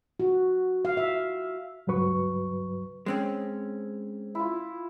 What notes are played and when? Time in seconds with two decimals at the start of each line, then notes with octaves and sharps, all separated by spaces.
0.20 F#4
0.85 F5
0.97 E5
1.87 C#2 G2 F#3 B4 C#6
3.06 G#3 C4 C#4
4.35 E4 F4